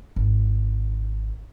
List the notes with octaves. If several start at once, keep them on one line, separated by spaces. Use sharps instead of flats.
G#1